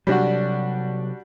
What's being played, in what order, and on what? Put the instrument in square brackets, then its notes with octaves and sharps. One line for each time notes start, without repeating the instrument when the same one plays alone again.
[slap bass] C3 F#3 [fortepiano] G3 D4 F#4